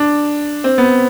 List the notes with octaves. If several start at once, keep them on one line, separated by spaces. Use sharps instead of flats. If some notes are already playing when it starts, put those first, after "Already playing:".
Already playing: D4
C4
B3